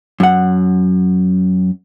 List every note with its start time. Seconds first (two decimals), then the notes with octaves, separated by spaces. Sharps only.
0.20 F#2 F#5